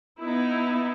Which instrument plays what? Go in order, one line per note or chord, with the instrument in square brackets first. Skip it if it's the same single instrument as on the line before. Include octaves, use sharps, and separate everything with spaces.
[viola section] B3 D#4 E4